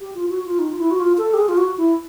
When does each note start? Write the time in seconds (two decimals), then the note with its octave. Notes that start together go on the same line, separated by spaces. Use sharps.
0.01 G4
0.15 F4
0.30 F#4
0.45 F4
0.59 D#4
0.71 F4
0.79 E4
0.91 F#4
0.99 F4
1.18 A4
1.34 G4
1.38 G#4
1.49 F4
1.57 F#4
1.77 E4